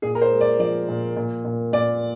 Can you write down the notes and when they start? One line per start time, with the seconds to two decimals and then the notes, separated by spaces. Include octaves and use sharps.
0.02 A#2 G#4
0.15 A#4
0.22 C5
0.31 G#3
0.41 D5
0.59 F3 D5
0.89 A#2
1.16 A#2
1.45 A#2
1.73 A#2 D5